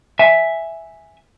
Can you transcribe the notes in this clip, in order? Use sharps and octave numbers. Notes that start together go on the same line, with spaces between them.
E5 G#5